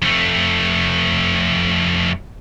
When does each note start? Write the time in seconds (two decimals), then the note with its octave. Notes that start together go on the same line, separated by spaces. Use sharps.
0.02 F2 A3